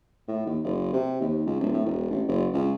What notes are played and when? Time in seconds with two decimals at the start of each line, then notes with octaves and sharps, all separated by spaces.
0.28 A2
0.46 D#2
0.64 F#1
0.93 C3
1.21 D#2
1.46 C#2
1.60 D1
1.73 A2
1.85 E1
2.11 A1
2.28 F#1
2.54 C#2